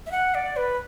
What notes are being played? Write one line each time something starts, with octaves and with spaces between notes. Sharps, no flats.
E5
F#5
D5
B4